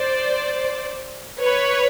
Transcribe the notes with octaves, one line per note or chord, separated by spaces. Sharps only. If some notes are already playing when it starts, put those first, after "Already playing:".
Already playing: C5 D5
B4 C#5